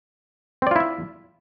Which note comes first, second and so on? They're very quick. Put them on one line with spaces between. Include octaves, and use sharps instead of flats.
C4 D5 F4 E4 E5